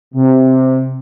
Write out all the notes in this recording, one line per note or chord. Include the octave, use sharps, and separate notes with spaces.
C3